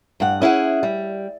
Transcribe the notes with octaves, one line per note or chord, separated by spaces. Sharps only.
G2 F#5
C#4 E4 G#4 F#5
G3